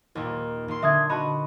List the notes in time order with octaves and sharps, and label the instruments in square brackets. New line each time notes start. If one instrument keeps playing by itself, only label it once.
[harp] D#2 A#2
D#2 C6
[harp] D3 [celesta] E5 D#6 G#6
[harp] F#4 D#5 [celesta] A5 B5